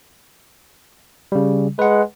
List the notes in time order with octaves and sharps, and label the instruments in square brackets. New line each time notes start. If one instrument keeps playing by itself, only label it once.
[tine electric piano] C#3 G3
[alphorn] G#3 [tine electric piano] B4 F#5